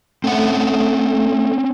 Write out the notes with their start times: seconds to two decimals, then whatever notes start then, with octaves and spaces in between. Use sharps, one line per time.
0.24 A3 C4 C#4 F#5